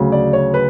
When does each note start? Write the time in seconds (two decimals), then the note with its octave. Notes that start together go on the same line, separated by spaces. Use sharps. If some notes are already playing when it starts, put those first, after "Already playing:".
Already playing: D2 C#3 F#3
0.12 D5
0.33 C#5
0.54 B4